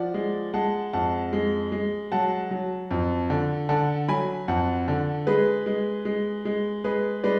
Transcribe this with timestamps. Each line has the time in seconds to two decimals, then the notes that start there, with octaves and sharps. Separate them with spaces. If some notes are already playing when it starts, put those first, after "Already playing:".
Already playing: F3 D5 F#5
0.14 G#3
0.54 G#3 F#5 A5
0.93 F2 F#5 A5
1.33 G#3
1.72 G#3
2.12 F#3 F#5 A5
2.51 F#3
2.91 F2
3.30 D3
3.69 D3 F#5 A5
4.08 F#3 G#5 B5
4.48 F2 F#5 A5
4.88 D3
5.27 G#3 G#4 B4
5.66 G#3
6.05 G#3
6.45 G#3
6.84 G#3 G#4 B4
7.23 G#3 B4 D5